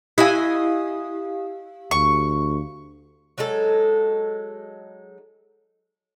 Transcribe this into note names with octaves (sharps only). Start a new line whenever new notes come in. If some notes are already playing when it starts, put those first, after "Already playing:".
E4 G4 D#5 F5 G#5
D2 C#6
F#3 G#3 D#4 A4